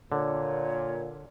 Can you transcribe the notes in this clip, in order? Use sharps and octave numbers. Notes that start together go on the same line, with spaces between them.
A#2 D3 C#5